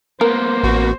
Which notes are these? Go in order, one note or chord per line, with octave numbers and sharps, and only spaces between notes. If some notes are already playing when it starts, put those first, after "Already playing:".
A#3 B3 A#4 C5
A1 F#4